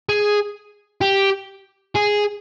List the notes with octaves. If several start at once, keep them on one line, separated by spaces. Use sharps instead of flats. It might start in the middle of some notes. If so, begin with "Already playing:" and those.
G#4
G4
G#4